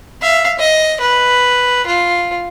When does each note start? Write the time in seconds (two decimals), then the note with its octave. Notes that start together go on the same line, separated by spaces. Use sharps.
0.21 E5 F5
0.59 D#5
1.00 B4
1.86 F4